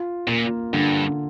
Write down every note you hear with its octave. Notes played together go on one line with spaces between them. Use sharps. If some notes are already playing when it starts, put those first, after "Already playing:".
Already playing: F4
A#2 A#3
G2 D3